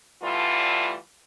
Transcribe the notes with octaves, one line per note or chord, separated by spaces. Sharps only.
D3 E3 G3 A3 F4